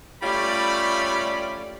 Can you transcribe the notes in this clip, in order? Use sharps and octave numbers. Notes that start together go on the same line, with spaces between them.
G3 A3 C#4 F4 D5 B5